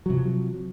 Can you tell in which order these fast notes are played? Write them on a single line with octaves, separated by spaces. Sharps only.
F#3 C3 F3